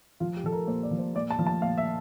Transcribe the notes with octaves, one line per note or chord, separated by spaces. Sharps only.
F3 F4
G4
F3 A4
A#4
A#2 C5
D5
F3
C5
A#2 D5
A5
F3
A5
A#2 F5
E5